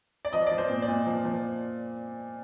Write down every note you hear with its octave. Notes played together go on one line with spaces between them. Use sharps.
D5
F3 D#5
F3 D5
C5
A#2
D5
A#2
F3
F3